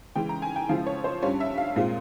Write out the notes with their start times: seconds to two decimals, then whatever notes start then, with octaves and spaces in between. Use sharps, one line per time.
0.15 C#3 E3 G#3 C#4 G5
0.29 A#5
0.42 G#5
0.56 G5
0.69 C#3 F3 G#3 E4 F5
0.87 C#5
1.04 C5
1.22 G2 G3 C#4 F4 C#5
1.40 E5
1.58 F5
1.76 A#2 G#3 C4 F4